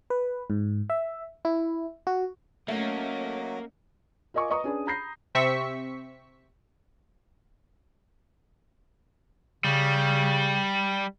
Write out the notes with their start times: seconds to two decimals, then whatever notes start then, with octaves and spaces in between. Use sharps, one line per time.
0.10 B4
0.50 G#2
0.90 E5
1.45 E4
2.07 F#4
2.68 F#3 A3 A#3 C#4 D#5
4.34 F4 A#4 D#5 G#5 C#6 D6
4.50 B4 D#5 A#5 C#6 D#6
4.64 C#4 D4 G#4 B4 D5
4.87 A#5 B5 G6 A#6 C7
5.35 C3 C4 E5 C#6 B6 C#7
9.64 C#3 G3